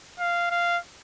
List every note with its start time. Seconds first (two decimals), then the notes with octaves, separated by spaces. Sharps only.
0.20 F5
0.51 F5